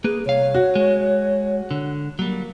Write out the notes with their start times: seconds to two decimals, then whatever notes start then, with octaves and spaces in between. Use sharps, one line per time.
0.04 A#3 G#4 B4
0.26 C2 C#5 F5
0.54 F#4
0.75 G#3
1.71 D3
2.19 F#3 G3 A#3